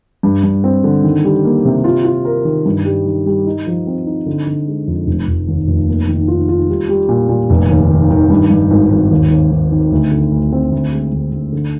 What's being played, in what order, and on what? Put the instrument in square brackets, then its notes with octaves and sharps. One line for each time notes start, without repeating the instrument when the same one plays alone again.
[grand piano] G2
G2
C4
D3
D#3
G3
A#3
C3
F4
F4
A#4
D#3
G2
G3
D#3
G3
D#4
F3
C4
D#4
D3
D3
G#3
F2
F1
F1
D#2
F1
A#3
D#3
F4
F4
G3
G3
A#2
A#2
F1
D#2
D#3
D#3
G2
G2
G#1
G#1
D#2
D#2
D#2
D#3
D2
D3
D2
C4
D2
G#3
D2
D2
D3